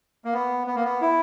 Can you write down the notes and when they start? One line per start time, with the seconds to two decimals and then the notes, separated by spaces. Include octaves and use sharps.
0.25 A#3
0.33 B3
0.67 B3
0.75 A#3
0.84 B3
1.01 E4